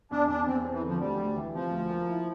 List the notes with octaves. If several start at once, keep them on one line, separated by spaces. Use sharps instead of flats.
E2 D4
E2 D4
E2 C4
C4
E3
D3 F3
D2 G3
D2
E3
C3 F3
D2
A#3
E4